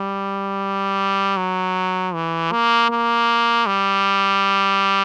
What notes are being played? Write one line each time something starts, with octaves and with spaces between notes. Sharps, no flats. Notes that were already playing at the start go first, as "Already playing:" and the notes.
Already playing: G3
F#3
E3
A#3
A#3
G3